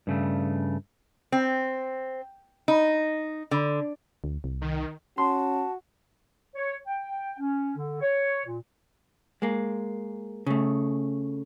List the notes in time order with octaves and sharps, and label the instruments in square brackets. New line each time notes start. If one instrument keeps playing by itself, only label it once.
[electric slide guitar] G2 C#3 A3
[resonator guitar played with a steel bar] C4
D#4
D3
[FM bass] D2
C2
[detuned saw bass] D#3
[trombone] C#4 [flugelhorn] F#4 [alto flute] A5 [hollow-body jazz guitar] C6
[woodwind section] C#5
G5
C#4
D3
C#5
A#2
[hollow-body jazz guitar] G#3 A#3
C#3 A3